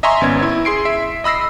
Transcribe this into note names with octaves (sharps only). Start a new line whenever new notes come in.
D#5 E5 G#5 A#5 C6 C#6
G#1 B3 C#4 E6 G#6
E4
G#4 C6 C7 D7
E5
D#5 B5 E6 A#6 C7